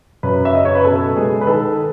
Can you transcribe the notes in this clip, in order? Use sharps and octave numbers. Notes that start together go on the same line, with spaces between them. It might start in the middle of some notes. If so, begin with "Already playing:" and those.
F#2 B4
E5
C#3 D#5
C#5
B4
B2 A4
G#3 G#4
B4
D#3 A4